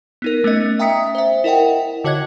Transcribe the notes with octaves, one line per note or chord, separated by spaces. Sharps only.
B3 D#4 A#4
A3 B3 C#4 D#5
E5 G5 A#5 D#6 B6 C#7
C5 E5
E4 A#4 D#5 F#5 G5
D3 F#4 C#5 D#5 F#6 G#6